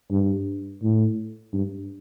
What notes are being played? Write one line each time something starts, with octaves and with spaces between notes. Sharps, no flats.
G2
A2
G2